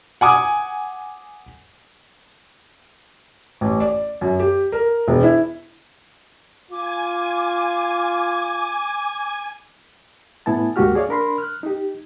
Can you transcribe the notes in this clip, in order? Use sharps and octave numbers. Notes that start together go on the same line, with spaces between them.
F#5 G#5 D6 D#6
A1
D5
F#2
G4
A#4
E1
E4
F4 G#5 D6
A2 B3 E4 G#5 A5
D2 G#2 A#3 F#4 G4 F6
G#4 C#5 D5 F5
D4 A#4 B5 C6
F6 F#6
D#4 G4